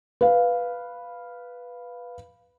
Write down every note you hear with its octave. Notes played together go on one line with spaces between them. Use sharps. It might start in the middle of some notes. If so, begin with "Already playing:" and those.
B4 F5